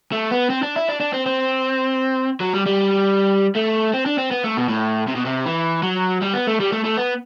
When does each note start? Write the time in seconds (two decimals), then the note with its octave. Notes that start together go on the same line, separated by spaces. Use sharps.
0.13 A3
0.31 B3
0.50 C4
0.63 D4
0.76 E4
0.89 D4
1.00 D4
1.13 C4
1.26 C4
2.40 F#3
2.54 G3
2.66 G3
3.55 A3
3.94 C4
4.06 D4
4.18 C4
4.31 B3
4.44 A3
4.57 B2
4.69 A2
5.08 C3
5.16 B2
5.26 C3
5.46 E3
5.83 F#3
6.22 G3
6.34 B3
6.47 A3
6.60 G3
6.72 A3
6.84 A3
6.97 B3